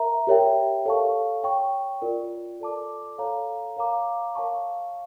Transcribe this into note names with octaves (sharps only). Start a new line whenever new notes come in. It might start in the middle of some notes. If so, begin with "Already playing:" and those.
Already playing: A#4 E5 A#5
G4 A#4 C#5 E5 G5
A4 C#5 F5 A5 C#6
C#5 G5 C#6
F4 A#4 D5
A4 D5 A5 D6
A4 C#5 F5 A#5
A#4 C#5 F5 A#5 D6
A#4 C#5 F5 A5 C#6